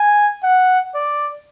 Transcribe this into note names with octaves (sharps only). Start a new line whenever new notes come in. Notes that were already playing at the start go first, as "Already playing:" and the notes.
Already playing: G#5
F#5
D5